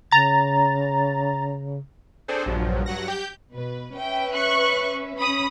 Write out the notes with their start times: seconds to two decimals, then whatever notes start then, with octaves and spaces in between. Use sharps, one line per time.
0.11 C#3 A#5 A6
2.28 C4 D4 G#4 A4 C5
2.46 A#1 G2 F3 F#3
2.86 G2 F#3 F#5 A#6
3.08 G4 G6
3.53 B2 B4
3.97 C#4 B4 E5 G5
4.32 C#6 F#6
5.18 C#4 B5 D#6